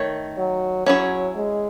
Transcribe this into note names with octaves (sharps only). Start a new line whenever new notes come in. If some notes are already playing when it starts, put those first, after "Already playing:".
Already playing: D#3 A3 C#5
F#3
F#3 C#4 E4 G#4 C#5
G#3